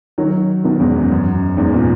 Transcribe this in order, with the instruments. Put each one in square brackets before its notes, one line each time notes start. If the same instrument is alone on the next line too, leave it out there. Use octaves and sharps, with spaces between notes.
[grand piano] D#3 F#3
B2 D#3
E2 G#2
F#2
F#2
E2 G#2
A#2